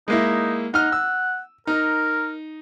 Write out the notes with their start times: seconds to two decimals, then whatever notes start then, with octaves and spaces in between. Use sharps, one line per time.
0.08 G#3 A#3 D#4 E4
0.74 D#4 F#5 F6
0.92 E6
1.67 D#4 A#4